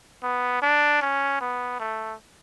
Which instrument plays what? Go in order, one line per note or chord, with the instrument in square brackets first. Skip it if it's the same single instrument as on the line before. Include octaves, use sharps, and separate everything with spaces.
[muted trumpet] B3
D4
C#4
B3
A3